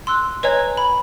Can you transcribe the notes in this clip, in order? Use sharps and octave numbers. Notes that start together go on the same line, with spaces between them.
C6 E6 F#6
B4 C#5 D#5 G#5 A#5 G#6
B5